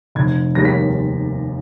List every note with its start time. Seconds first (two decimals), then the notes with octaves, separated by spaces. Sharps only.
0.15 F1 G#6
0.55 D#2 D#3 G3 A#6
0.65 B6